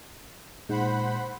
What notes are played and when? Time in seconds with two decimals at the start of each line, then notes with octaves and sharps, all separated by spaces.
0.69 A#2 G#3 D#4 C5 F#5 B5